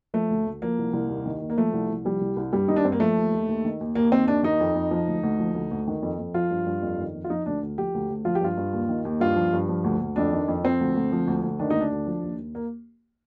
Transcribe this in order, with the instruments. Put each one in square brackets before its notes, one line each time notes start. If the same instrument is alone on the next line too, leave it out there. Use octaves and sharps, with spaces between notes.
[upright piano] F3 A3
D2
D2
F3 A#3
C2
C2
D#2
D#3
D#2
A#3
F3 A3
C2
C2
F3 G3
C2
C2
G2 G3
D#3 D#4
D4
G2 C4
A#3
F3 A3
D#2
D#2
D#2
D#3
D#2
D#2 A#3
D#3 C4
D#2 D4
D#3 D#4
F2
F2
F3
D2
D2
F3
D2
D2
D#3
F2
F2
F3 F4
G2
G2
F2
D#3
F2
F4
F3 D#4
D2 D4
D2
F3 G4
D2
D2
F3 F4
G4
G2 F4
G2
D#2
D#3
D#2
G2 F4
F3
G2
F3
D2
D2
F2 D4
D#3
F2
F3 C4
D2
D2
F3
D2
D2
D#3 D4
D2 D#4
D4
D2
F3
D#2
D#2
A#3